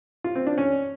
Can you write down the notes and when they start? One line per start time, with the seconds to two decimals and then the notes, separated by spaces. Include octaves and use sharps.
0.24 F4
0.35 C4
0.47 D4
0.58 C#4